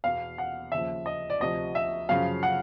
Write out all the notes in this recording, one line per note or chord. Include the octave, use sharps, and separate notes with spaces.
E2 B2 F5
F#5
D#2 C#3 F3 E5
D#5
D5
D2 C3 F3 D#5
E5
F#2 C#3 F3 F5
F#5